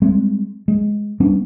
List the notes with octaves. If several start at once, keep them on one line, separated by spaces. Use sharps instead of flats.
G3 G#3 C4
G#3
G3 B3 C#4 D4